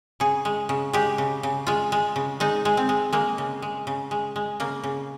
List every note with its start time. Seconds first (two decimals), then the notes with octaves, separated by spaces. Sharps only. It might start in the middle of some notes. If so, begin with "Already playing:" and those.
0.20 C#3 G#4
0.45 G#3
0.69 C#3
0.93 G#3 G4
1.18 C#3
1.43 C#3
1.67 G#3 F4
1.92 G#3
2.16 C#3
2.40 G#3 D#4
2.65 G#3
2.77 C4
2.89 G#3
3.13 G#3 A#3
3.38 C#3
3.62 G#3
3.87 C#3
4.11 G#3
4.36 G#3
4.60 C#3 A#3
4.83 C#3